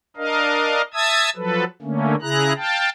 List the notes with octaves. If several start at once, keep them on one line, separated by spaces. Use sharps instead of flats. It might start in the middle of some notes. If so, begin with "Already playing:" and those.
D4 A#4 D#5 F5
E5 A5 D#6 E6 G#6
F3 F#3 A4 B4
D3 A3 A#3 C#4
C#3 E4 G#4 A#5 F#6
F5 G5 A5